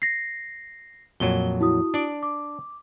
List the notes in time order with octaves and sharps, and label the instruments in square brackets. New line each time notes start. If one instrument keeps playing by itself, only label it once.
[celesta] A#6 C7
[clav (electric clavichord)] F2 A#2 F#3 [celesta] G7
[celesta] E4 F#4 D#6
[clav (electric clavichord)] D4 D5
[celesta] D6